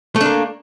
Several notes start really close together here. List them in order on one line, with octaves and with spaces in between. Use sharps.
A3 D4 A#3